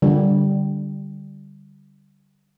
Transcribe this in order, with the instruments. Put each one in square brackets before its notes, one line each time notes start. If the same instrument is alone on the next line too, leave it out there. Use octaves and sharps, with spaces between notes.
[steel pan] D3 G3